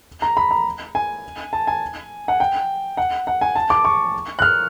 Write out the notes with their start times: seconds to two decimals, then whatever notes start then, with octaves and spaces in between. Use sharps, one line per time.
0.22 A#5
0.37 B5
0.51 A#5
0.95 G#5
1.53 A5
1.67 G#5
2.28 F#5
2.40 G5
2.97 F#5
3.27 F#5
3.41 G#5
3.56 A5
3.70 D6
3.85 C#6
4.39 F#6
4.42 F6